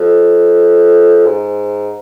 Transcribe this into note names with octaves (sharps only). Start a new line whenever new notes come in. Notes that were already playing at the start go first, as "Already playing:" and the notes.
Already playing: F2
G#2